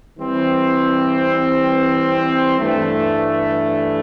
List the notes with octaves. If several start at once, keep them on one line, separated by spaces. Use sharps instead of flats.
E3 G3 C4
G2 E3 A3